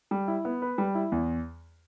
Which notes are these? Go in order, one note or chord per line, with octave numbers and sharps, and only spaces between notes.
G3
E4
B3
B4
G3
E4
E2